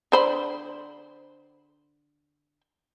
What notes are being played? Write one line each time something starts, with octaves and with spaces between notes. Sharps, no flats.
D3 C5 B5